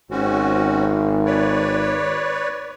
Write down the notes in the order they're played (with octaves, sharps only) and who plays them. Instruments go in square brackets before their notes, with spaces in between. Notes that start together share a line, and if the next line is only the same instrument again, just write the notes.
[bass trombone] G#1 [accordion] C4 C#4 F#4
[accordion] B4 C#5 D5